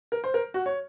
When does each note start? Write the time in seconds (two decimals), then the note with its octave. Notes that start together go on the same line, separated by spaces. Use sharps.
0.12 A#4
0.24 C5
0.34 A#4
0.54 F#4
0.66 C#5